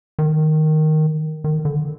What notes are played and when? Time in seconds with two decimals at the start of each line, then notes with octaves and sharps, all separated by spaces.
0.19 D#3
1.44 D#3
1.65 D3